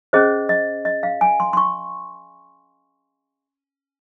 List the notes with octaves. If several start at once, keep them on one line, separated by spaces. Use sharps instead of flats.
C#4 G#4 C5 D#5
D#5
D#5
F5
G#5
C6
C6
C#6